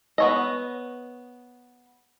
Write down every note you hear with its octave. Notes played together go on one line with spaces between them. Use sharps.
B3 C#5 D#5